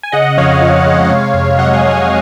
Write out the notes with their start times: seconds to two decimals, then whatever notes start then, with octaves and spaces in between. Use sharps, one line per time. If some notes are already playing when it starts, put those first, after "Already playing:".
0.03 G#5
0.12 C#3 D#5 F#5
0.37 F2 C#5 F5
0.61 F3
0.86 G#3
1.10 C3
1.34 F2
1.59 F#3 D#5 F#5
1.74 F5 G#5
1.83 F2
1.90 F5 G#5